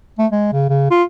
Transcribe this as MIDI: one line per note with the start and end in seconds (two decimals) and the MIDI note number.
0.18 0.27 57
0.32 0.48 56
0.52 0.66 49
0.69 0.88 49
0.91 1.03 65